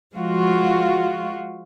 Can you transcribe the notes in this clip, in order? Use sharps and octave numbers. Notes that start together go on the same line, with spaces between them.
F3 G#3 F4 F#4